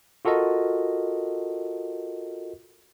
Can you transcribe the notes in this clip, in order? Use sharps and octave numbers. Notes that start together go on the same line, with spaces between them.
F4 F#4 A4 A#4 D#5